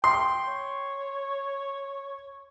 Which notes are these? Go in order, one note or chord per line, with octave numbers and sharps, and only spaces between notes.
G5 C6
C#5